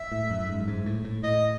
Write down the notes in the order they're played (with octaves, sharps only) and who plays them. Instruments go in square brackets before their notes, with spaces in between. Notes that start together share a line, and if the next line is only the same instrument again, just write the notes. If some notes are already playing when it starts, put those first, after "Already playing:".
Already playing: [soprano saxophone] E5
[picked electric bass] A2
F#2
G#2
F#2
G#2
A2
A2
[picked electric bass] A2 [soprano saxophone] D#5